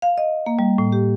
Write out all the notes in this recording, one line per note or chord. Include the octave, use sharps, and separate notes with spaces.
F5
D#5
A#3
G3
A2
G4